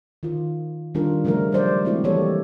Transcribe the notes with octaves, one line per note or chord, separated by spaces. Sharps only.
D#3 F4
D#3 G3 D4 F4 A#4
C#3 F3 G3 A3 A#4
F#3 G3 D4 C5 D5
G#3 A3 C4 E4 F#4 C5
E3 G3 A#3 G4 A4 C#5